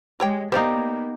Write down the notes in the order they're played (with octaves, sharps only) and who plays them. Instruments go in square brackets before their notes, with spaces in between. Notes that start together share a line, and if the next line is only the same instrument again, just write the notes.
[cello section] G#3 [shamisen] G4 C#5 G5
[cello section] A#3 B3 [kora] D#4 G4 [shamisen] C5 D5 F5